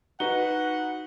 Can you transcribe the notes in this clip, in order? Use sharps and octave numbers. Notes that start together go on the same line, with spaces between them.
D#4 F#4 B4 F#5 G7